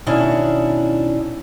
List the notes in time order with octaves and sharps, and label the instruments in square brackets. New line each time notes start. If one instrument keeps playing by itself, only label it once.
[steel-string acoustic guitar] B2 D#3 C#4 D4 E4